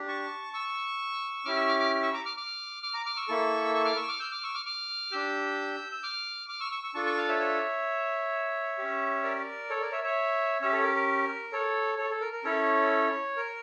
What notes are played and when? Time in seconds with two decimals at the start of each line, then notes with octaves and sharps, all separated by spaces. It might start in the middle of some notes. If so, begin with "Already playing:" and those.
Already playing: D4 G4
0.08 A5 C#6
0.53 C#6 E6
1.45 C#4 E4 G4 D6 F6
1.56 C#6 E6
1.67 D6 F6
1.79 D6 F6
2.02 C#6 E6
2.13 A#5 D6
2.26 D6 F6
2.37 D6 F6
2.83 D6 F6
2.94 A#5 D6
3.06 D6 F6
3.17 C#6 E6
3.28 A#3 E4 A4
3.74 C#6 E6
3.85 D6 F6
3.97 C#6 E6
4.08 D6 F6
4.20 E6 G6
4.31 D6 F6
4.43 C#6 E6
4.54 D6 F6
4.66 D6 F6
5.12 D4 G4 E6 G6
5.92 E6
6.03 D6 F6
6.48 D6 F6
6.60 C#6 E6
6.71 C#6 E6
6.83 C#6 E6
6.94 D4 F4 A4 A5 C#6
7.06 A5 C#6
7.17 F5 A5
7.29 C#5 E5
7.40 C#5 E5
8.78 C#4 G4
9.23 A#4 D5
9.70 A4 C#5
9.81 A#4 D5
9.92 C#5 E5
10.04 C#5 E5
10.61 C#4 G4 C#5 E5
10.72 A4 C#5
10.83 A#4
10.95 A#4
11.53 A4 C#5
11.98 A4 C#5
12.10 A4
12.21 A#4
12.33 A#4
12.44 C#4 E4 A4 C#5
13.36 A#4